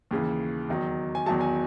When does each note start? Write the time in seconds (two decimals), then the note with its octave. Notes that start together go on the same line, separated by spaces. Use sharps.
0.11 D#2 C#3 E3
0.69 E2 D#3 F#3
1.15 G#5
1.26 E2 D#3 F#3 A5
1.41 G#5